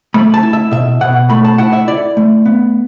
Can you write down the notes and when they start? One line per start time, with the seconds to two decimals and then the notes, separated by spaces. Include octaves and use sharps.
0.14 A3 B5
0.34 A5
0.43 E4
0.53 E5
0.71 B2 E5
1.01 B2 F#5
1.30 A3 B5
1.44 A5
1.58 E4 F#5
1.73 E5
1.88 E4 D5
2.17 A3
2.45 B3